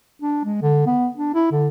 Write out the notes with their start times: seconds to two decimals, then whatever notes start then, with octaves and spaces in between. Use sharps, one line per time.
0.22 D4
0.44 G#3
0.62 D3
0.86 B3
1.17 D4
1.34 E4
1.52 D3